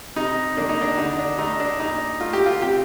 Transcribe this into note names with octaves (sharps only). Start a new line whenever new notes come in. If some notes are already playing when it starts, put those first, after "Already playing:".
C3 D#4
D#3 A#3 D4
D#4
D4
D3 D#4
D4
A3 D#4
D4
A#2 D#4
A3 F4
G4
F4
C3 G4